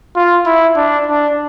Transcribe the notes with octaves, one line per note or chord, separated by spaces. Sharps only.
F4
E4
D4
D4